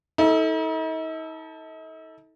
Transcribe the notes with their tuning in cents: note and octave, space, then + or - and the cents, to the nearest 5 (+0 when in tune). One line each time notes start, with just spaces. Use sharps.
D#4 +45 A4 +0